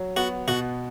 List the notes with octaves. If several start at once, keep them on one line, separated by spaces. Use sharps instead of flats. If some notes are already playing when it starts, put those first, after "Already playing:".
Already playing: F#3
B3 F#4
B2 F#4